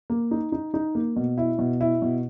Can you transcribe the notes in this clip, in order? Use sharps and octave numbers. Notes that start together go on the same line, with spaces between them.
A#3
D#4
D#4
D#4
A#3
B2
E4
B2
E4
B2